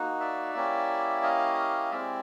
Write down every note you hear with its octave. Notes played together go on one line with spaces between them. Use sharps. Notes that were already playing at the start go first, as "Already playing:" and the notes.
Already playing: A#3 D#4 F#4
D5 E5
A#3 C#4 E4 G4
D#5 F5
G#3 C4 E4 G4 D5 E5